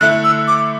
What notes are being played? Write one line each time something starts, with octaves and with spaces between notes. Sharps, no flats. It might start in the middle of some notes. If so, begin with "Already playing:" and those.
D3 A3 E4 F#6
E6
D6